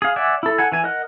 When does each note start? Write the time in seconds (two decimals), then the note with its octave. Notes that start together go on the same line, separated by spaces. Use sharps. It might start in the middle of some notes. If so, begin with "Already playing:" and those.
0.02 G#4 F5
0.16 D5 E5 F#5 G#5
0.43 E4 A4
0.59 A4 F#5 G#5
0.72 E3 G#5
0.84 A#4 D#5 F#5 F#6